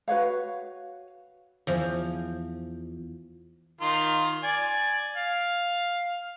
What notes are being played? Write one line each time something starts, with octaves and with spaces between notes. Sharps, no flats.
F#4 B4 C#5 F5
E2 F3
D#3 F4
D5 G#5
F5